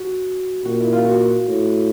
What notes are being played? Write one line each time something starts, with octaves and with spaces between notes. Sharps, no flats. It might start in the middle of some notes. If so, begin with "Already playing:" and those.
Already playing: F#4
A#2 F#4
E4
F4
F#4
A2